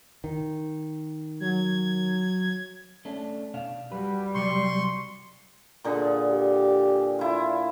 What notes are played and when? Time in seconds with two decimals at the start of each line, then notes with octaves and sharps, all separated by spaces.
0.24 D#3
1.40 F#3 G#6
3.05 A3 C#4 D4
3.54 B2 D4 F5
3.92 G3 F#4 B4
4.35 C2 F#3 D5 C6 C#6
5.84 A#2 D3 G#4
6.30 G4
7.19 E4 F4